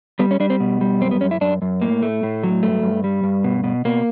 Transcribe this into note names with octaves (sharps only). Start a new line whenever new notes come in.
G3 B3
C#4
G3 D4
C4
B2
G3
F#2 C4
B3
F#2 C#4
E4
F#2 D4
F#2
A2 A#3
A3
A2
F#3
G2 A3
G2
G3
G2
B2
B2
B2 A#3